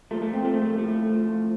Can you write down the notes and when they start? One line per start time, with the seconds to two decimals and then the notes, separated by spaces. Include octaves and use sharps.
0.11 A#2 A3
0.14 F3
0.22 A3
0.34 C4
0.44 A#2 F3 A3
0.62 A3
0.78 A2 F3 A3
1.12 A2 F3